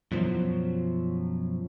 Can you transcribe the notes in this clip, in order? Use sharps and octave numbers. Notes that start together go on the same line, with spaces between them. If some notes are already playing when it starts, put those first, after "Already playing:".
F#2 B2 F3 F#3